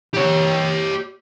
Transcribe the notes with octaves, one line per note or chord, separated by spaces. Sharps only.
G4 C#5